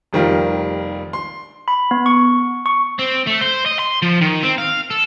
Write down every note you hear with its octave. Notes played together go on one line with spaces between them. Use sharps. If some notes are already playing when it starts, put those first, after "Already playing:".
F1 D#3 G3 F4
C6
B5
B3
C#6
C#6
C4
A3
C5
D#5
C6
F3
D#3
C4
F5
A4